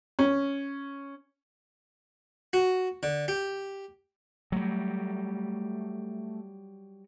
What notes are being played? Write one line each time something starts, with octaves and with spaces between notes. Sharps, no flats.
C#4
F#4
D3
G4
F#3 G3 A3